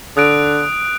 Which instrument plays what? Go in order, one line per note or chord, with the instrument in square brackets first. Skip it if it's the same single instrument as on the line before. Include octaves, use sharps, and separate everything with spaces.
[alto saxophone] D3 [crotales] D#6 F#6 D7